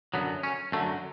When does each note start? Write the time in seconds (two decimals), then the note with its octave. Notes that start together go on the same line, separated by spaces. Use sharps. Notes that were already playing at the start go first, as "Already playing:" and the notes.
0.14 F#2 D3 F#3 B3
0.43 C#4
0.72 F#2 D3 F#3 A3